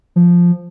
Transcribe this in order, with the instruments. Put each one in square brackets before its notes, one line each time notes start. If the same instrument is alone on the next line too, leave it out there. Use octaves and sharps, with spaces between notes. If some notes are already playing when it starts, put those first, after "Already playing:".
[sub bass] F3